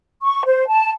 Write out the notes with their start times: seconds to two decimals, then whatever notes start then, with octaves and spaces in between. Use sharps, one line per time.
0.22 C#6
0.45 C5
0.68 A5